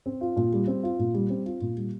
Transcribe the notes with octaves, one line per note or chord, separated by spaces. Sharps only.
C4
F4
A#2
G3
C4
F4
A#2
G3
C4
F4
A#2
G3